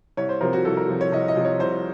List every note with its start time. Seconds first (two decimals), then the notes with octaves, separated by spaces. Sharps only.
0.17 C2 C#5
0.29 C5
0.41 C3 F3 A#4
0.53 F#4
0.65 C2 A4
0.77 A#4
0.88 C3 F3
1.01 C#5
1.12 C2 D#5
1.28 D#5
1.36 C3 F3
1.45 C#5
1.60 C2 C5